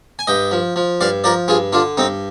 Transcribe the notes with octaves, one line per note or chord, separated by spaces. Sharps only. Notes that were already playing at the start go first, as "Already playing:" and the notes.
G#5
G2 D#5 G5
F3
F3
G2 D5 F5
F3 A#4 D5
G2 F4 G#4
D3 D4 F4
G2 C4 D#4